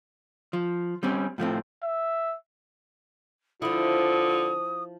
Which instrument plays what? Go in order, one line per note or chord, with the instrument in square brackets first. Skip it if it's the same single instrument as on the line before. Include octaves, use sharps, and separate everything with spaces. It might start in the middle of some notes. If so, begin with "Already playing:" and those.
[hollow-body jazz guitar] F3
G3 C4 C#4
A2 F3 A3 C4
[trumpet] E5
[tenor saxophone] D3 [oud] F3 E4 [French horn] F4 [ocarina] D#6